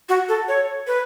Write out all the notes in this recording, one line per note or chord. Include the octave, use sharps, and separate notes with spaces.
F#4
A4
C#5
B4